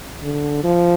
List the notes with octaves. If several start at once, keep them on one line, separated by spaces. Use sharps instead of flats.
D3
F3